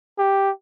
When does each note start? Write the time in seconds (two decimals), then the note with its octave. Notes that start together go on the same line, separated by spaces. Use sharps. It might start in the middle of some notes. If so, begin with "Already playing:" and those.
0.18 G4